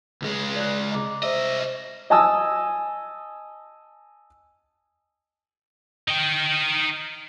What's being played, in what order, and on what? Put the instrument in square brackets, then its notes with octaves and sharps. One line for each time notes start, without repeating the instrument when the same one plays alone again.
[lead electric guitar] C#2 G#3
[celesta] D5 F#6
D#5 A#5 D6
[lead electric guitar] C2 D#5 [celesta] C5 E5 E6
[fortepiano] D#5 G#5 A5 D#6 E6
[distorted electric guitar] D#4 G5